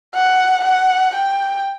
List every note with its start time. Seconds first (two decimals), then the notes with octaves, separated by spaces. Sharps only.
0.15 F#5
0.64 F#5
1.15 G5